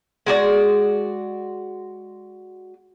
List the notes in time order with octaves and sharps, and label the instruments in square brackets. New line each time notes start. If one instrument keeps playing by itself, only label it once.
[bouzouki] G#3 F#4 D5